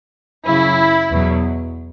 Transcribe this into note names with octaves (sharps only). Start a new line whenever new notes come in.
F#2 C#3 F#3 E4
E2 B2 F#3